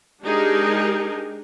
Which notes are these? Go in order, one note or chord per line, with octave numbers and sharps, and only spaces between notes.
G#3 D4 D#4 G4 G#4 A#4